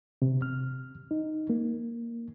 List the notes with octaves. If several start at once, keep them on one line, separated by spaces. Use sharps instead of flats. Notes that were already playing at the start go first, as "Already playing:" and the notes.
C3
F6
D#4
A#3